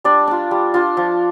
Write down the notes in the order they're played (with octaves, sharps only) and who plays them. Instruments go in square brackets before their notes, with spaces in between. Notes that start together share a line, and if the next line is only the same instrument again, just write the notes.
[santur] G3 D4 D5
D4 F4
G3
D4 F4
F3